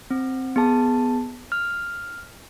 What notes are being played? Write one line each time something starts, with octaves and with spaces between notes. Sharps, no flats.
C4
B3 G#4 A5
F6